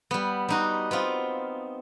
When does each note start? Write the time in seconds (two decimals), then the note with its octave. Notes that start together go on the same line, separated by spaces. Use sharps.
0.11 G3 B3
0.49 G3 D#4 F#4
0.91 B3 C4 F4